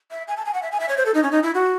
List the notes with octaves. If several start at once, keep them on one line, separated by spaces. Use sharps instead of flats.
E5
G#5
A5
G#5
F#5
E5
G#5
E5
C#5
C5
A4
D#4
C#4
D#4
E4
F#4